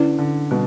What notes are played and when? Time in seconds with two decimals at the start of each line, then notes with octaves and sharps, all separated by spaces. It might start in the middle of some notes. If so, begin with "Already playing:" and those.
Already playing: D3 C#4 E4 B4 D5
0.18 D3
0.51 B2 G3